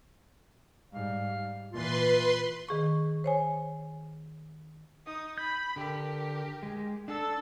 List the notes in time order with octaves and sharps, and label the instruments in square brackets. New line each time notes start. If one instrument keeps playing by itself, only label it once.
[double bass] G#2 G3 [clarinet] F5
[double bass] A#2 E3 [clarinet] F4 [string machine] B4 C6
[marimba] D#3 G#4 C#6
C5 C#5 G#5
[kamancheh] D#4 D#6
[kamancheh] B5 [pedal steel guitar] G6
[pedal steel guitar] D3 [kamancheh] G4 A#4
[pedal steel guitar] G#3
[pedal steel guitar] D4 [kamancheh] A4